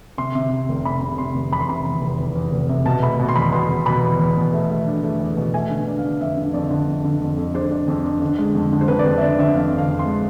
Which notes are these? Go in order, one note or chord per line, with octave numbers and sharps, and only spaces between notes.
C3 C6
C3
C3
F1
C3 B5
C3
C3 C6
F1
E2 B5
C6
C3 B5
E2
F1
E2
E2
F1
C3
B2 A5
A3 B5
B2
C6
E2 B5
B2 C6
B2
B2 B5
E2
E2
B2
A3
A3
D4
A3
E2
B2
A3 G#5
D3
D4
F5
D4
F2 E5
D3
F2 D5
D3
F2
D3
F2
F2
D4 C5
D4
F2
D4
D3
G#3
F2
D3
C5
F2 B4
D5
F2 C5
E5
D4 D5
D3 E5
F2 F5
F2
F5
F2
C6
G#3